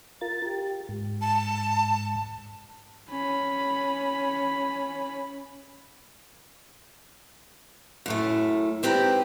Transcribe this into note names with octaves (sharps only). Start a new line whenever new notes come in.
F4 A#4 A6
G4
G#2
A5
C#4 B5
F#2 A2 A3
G#2 C4 G4 B4 D5 A#5